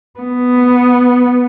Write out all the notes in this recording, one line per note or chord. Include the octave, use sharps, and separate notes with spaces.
B3